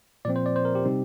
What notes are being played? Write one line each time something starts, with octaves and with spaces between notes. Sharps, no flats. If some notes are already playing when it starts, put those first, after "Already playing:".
A#2 F3 C4 D5
C5
D5
C5
A#4
G4
C3 G3 C4 D#4